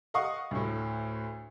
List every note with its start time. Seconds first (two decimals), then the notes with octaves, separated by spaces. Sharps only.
0.14 D#5 F5 F#5 C#6 D#6
0.51 D2 A2